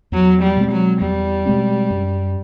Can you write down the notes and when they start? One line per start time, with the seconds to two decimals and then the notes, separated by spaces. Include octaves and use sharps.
0.12 E2 F#3
0.42 G3
0.57 B2 G#3 C4
0.72 F#3
1.01 E2 G3
1.46 B2 G#3 C4
1.90 F#2